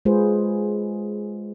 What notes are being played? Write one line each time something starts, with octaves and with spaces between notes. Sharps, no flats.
G#3 F4 G#4 B4 C5